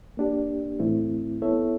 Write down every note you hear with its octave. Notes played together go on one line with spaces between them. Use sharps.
A#3 D4 G4
A2 E3 A3 C4 E4
B3 E4 A4 C#5 E5